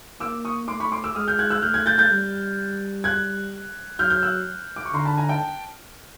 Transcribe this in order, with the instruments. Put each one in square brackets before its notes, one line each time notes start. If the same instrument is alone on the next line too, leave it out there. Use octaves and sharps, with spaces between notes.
[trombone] A#3 [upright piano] D6 E6
[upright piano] C#6 D#6
[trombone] A3 [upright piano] C6 D6
[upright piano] B5 C#6
C6 D6
D6 E6
[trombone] G#3 [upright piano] D#6 F6
[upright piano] F6 G6
F#6 G#6
E6 F#6
[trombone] A3 [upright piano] F6 G6
[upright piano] F#6 G#6
G6 A6
G6 A6
[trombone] G3
[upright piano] F#6 G#6
[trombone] F#3 [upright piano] F6 G6
[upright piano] F6 G6
E6 F#6
D6
C#6
[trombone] D3 [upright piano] A#5 C6
[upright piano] A5 B5
G#5 A#5
G5 A5